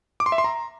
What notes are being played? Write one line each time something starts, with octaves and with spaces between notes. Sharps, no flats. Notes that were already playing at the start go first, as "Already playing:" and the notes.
D6
C6
E5
C6
A#5